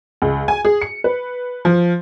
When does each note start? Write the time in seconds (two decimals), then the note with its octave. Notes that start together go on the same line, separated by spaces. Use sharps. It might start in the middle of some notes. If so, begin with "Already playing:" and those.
0.22 C#2
0.48 G#5
0.65 G#4
0.82 C#7
1.04 B4
1.65 F3